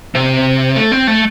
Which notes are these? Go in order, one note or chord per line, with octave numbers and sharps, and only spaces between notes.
C3
A3
C4
A3